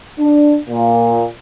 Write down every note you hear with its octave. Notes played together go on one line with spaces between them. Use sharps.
D4
A#2